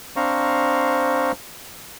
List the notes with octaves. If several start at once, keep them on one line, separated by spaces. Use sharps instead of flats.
C4 D4 C5 F5 A#5 C#6